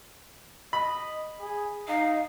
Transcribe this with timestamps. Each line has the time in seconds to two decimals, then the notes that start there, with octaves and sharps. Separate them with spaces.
0.73 D#5 B5
1.40 G#4
1.88 D#4 F5